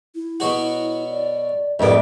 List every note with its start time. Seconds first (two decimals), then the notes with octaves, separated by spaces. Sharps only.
0.15 E4
0.40 B2 F#3 F#4
1.11 D5
1.79 C2 F2 A2 B3 D5